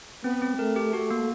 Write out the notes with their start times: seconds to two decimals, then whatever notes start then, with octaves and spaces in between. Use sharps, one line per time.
0.24 B3 C4
0.42 C4
0.59 A3 A#4
0.76 G4
0.93 F#4
1.11 A#3